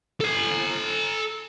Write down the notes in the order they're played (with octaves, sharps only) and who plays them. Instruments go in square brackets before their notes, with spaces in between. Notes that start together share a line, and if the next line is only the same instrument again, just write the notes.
[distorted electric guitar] A4 G#5